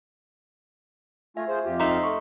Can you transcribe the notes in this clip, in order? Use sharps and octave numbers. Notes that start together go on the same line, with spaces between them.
A3 F4 E5 G#5
F4 G#4 C5
F2 F4 G4
D#4 E5 F5 C6
A3 C#6